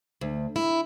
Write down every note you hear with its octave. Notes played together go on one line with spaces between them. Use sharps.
D2
E4